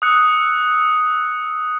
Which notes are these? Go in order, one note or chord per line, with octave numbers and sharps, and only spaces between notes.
D#6 E6 F#6 C#7